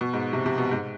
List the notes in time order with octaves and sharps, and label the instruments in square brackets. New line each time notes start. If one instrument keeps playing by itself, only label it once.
[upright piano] B2
G#2
C3
C3
B2
G#2